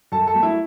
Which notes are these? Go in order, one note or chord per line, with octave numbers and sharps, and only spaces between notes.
F#2 A4 A5
A4 A5
F#3 A3
E4 E5